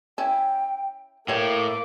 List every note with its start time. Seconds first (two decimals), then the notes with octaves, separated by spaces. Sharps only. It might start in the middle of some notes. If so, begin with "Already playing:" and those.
0.18 C#4 E4 G5
1.28 A2 A#3 G4 C#5 E5 D6